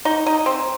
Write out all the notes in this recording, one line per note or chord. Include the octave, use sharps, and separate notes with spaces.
D#4
D#4
C4